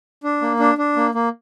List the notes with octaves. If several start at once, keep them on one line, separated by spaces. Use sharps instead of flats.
D4
A#3
D4
D4
A#3
A#3